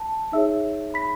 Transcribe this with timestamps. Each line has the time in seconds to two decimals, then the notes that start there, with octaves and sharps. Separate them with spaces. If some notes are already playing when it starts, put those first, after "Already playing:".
Already playing: A5
0.32 D#4 G#4 C#5 E5 E6
0.94 B5 B6